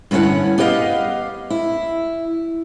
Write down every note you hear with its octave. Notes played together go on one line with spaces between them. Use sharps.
G2 D3 C#4 E4 F#5
B3 G4 B4 D#5 F5
E4